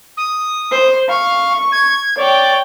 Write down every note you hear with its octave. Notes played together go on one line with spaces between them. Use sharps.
D#6
C5
F5 C#6
G#6
C#5 D5 G5